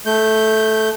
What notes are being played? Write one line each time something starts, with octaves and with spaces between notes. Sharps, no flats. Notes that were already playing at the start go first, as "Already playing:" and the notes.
A3 G6